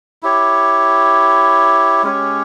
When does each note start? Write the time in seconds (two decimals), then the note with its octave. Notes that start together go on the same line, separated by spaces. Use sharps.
0.23 E4 G4 C#5
2.03 G#3 C#4 G4 C#5